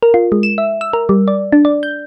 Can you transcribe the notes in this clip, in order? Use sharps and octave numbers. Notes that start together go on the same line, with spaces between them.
A#4
F4
G#3
E7
E5
E6
A#4
G3
D5
D4
D5
G6